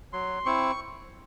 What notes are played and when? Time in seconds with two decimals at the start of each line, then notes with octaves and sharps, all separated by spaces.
0.13 F#3 C6
0.46 C4 E4 C#6